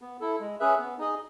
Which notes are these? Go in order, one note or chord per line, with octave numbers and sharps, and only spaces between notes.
B3
E4 A4
G#3
C#4 G#4 B4 E5
B3
D#4 G#4 D#5